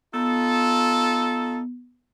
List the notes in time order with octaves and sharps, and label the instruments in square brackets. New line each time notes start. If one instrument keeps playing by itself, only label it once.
[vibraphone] B3 [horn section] D#4 F4 A4